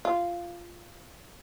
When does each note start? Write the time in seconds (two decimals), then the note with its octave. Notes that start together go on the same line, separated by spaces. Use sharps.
0.05 F4